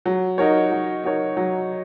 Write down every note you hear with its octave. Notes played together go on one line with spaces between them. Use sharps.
F#3
D#4 F#4 A#4 C#5
F#3
D#4 F#4 A#4 C#5
F#3